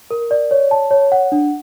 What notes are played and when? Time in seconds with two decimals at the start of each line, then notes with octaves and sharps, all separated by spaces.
0.11 A#4
0.31 D5
0.51 C#5
0.71 A5
0.91 C#5
1.12 F#5
1.32 D4